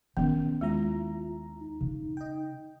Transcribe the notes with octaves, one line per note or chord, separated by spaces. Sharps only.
D#3 B3 C#4
D#2 G#3 E4 F4 A#5
D#4
C#3
D#5 G5